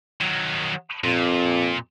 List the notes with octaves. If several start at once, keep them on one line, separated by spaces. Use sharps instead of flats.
D#3 F#3
F2 A#2